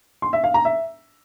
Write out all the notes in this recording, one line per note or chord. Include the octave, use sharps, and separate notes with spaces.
C6
E5
F5
A#5
E5